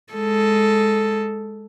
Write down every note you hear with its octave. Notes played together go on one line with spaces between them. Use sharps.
G#3 A4